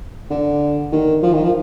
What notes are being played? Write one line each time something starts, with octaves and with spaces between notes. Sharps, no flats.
D3
D#3
F3
D#3
F3